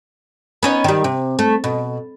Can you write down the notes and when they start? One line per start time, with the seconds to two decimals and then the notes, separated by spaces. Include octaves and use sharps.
0.63 B3 C#4 D#4
0.84 D#3 G3
1.04 C3
1.39 A3
1.64 B2